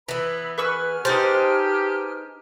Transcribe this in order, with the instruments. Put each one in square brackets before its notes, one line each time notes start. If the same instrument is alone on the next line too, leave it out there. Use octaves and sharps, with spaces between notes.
[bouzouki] E3 B3 [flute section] B4 B5 E6
[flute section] G#4 G#5 F6 [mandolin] B4 C#6 E6
[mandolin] D#4 A5 [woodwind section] G4 [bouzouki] B4 C5